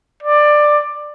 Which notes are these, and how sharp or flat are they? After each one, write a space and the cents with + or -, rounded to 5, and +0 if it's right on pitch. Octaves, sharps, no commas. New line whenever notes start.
D5 +15